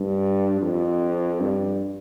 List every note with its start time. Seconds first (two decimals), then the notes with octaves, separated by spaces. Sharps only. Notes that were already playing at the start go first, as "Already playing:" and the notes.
Already playing: G2
0.61 F2
1.40 G2